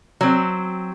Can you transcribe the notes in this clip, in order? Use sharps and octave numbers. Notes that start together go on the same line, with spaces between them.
F#3 C4